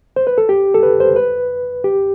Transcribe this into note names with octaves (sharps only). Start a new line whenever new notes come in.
C5
B4
A4
G4
A4
B4
C5
B4
G4